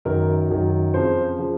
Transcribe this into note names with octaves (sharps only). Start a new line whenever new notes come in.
F#2 D#3 F#3 A#4
F#2 D#3 F#3
F2 C#3 F3 C5
C#3 F3